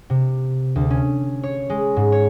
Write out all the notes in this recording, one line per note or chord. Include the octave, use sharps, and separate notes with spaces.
C3
D2
C#4
C#5
G#3
G#2
C#5